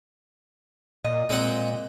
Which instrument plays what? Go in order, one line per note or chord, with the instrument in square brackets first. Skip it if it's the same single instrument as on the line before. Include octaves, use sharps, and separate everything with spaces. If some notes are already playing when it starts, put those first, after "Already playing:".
[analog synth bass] A#2 [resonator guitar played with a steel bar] D#5
[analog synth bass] A#2 [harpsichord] G#3 C4 F#5